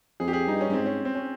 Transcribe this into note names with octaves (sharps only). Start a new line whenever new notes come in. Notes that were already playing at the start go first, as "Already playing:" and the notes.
F2 G#4
G4
G#4
G2 D#4
C#4
G2
G#2 C4
C#4
C4
C#4